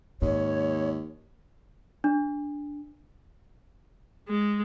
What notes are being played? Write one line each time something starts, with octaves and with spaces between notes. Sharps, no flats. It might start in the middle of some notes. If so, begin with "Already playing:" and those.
D#2 G#2 C#5
D4
G#3